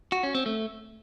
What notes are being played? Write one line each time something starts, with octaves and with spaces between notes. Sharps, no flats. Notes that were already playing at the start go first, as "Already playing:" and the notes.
F#4
C#4
C4
A3